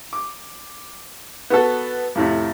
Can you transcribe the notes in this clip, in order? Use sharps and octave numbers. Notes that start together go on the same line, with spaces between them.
D6
B3 F#4 A4
F2 A2 C3